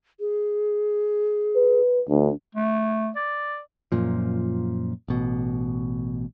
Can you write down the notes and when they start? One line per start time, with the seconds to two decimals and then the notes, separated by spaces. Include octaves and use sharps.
0.20 G#4
1.55 B4
2.08 D2 D4
2.55 A3
3.16 D5
3.92 F#2 A#2 F3
5.08 A1 B2